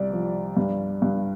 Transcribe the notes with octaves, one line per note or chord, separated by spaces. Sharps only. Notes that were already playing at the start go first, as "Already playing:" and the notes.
Already playing: C2 D5
F3
G2
G2